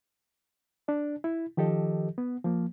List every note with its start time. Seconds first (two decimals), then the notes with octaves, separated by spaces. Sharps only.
0.88 D4 D5
1.24 E4
1.57 D#3 F3 G4 A4 D#5
2.18 B3
2.45 F3 A#3